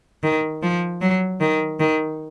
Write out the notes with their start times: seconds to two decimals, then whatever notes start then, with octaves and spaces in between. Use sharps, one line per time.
0.23 D#3
0.62 F3
1.01 F#3
1.41 D#3
1.80 D#3